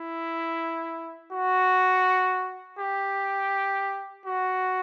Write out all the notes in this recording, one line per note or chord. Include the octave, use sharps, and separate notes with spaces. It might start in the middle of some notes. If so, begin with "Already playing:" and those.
Already playing: E4
F#4
G4
F#4